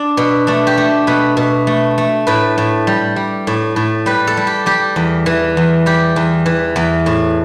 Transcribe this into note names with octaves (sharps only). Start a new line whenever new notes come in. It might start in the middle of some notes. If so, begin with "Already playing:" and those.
Already playing: D4
B2
A3 D4
G4
A3
B2 B4
B2
A3
A3
A2 B4
A2
G3
G3
A2
A2
G3 B4
A4
G3
G4
G3 G4
E2
E3
E2
G3 G4
E2
E3
E2
A2